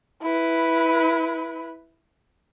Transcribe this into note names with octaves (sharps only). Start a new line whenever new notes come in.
E4 B4